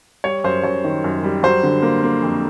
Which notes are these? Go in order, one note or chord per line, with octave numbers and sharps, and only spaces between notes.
G3 C#5
F#2 C5
F#2 C#5
D#3
F#2
G3
F#3 C5
D3
A#3
A#3
F2